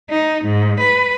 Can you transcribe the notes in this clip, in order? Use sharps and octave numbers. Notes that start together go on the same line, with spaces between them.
D#4
G#2
B4